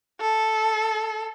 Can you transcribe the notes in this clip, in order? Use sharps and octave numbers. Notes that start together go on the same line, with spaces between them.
A4